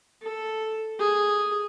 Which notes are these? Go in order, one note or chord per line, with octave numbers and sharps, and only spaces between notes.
A4
G#4